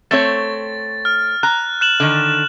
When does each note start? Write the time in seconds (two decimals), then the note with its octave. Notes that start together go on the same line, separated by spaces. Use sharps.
0.11 A3 C4 C#5 A6
1.05 F6
1.43 A#5 F#6
1.81 F#6 E7 F#7
2.00 D3 D#3